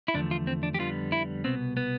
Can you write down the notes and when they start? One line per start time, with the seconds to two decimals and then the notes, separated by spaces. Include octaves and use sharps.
0.08 E4
0.14 E2 D3 F3 A3 D4
0.31 F4
0.47 C4
0.63 D4
0.74 G4
0.79 F2 D3 G3 B3 F4
1.12 E4
1.44 C2 B2 B3 C4
1.77 B3